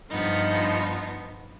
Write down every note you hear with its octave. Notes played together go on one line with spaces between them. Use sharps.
G2 F3 B3 D#4